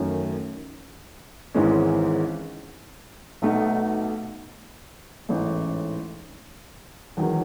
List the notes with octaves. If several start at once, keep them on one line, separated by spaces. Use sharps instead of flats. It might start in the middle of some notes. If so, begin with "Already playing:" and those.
Already playing: F#2 D#3 F#3 A3 C#4
G#1 G#2 E3 G#3 C#4
B1 B2 A3 D#4 F#4
A1 G#2 E3 A3 C#4
E1 E2 D#3 F#3